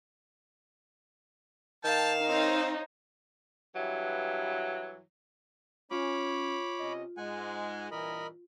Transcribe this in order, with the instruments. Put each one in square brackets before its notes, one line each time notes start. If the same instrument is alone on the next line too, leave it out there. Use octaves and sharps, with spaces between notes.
[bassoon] D#3 [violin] F5 E7 [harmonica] G5 A5
[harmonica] C4 [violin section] D#4 C5 C#5
[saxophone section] G2 E3 F#3
[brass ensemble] C#4 [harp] F4 [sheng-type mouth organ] C#5 B5 D6
[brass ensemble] C3 C#4 D#5
[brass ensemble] G#2 G#3 [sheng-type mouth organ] F#5 G#5
[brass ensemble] G2 A#2 E3 [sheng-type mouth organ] A#4 D#5 B5